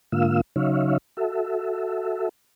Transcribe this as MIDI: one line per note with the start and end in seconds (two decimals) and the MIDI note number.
0.12 0.41 44
0.12 0.41 50
0.12 0.41 58
0.12 0.41 65
0.12 0.41 77
0.12 0.41 88
0.56 0.98 49
0.56 0.98 54
0.56 0.98 63
0.56 0.98 73
0.56 0.98 76
0.56 0.98 77
1.17 2.29 66
1.17 2.29 69
1.17 2.29 76